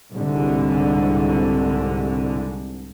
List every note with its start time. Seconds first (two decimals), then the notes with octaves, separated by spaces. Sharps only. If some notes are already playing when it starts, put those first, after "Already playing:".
0.12 C2 G#2 D3